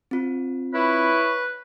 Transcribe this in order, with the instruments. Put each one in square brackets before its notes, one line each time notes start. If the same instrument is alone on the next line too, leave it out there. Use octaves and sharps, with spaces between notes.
[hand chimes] C4 F4
[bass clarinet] E4 [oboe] B4 [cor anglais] C#5